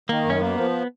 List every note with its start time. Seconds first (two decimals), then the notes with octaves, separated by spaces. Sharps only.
0.09 D#3 A#3
0.25 F#2
0.30 C#4
0.41 A#3 B3
0.57 F3